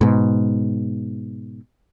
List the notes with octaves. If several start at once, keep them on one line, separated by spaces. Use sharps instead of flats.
G#2 B2